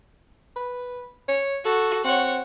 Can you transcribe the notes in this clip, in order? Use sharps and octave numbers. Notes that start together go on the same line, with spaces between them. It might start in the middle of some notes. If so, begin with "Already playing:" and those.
B4
C#5
F#4 A4
C4 C#5 F#5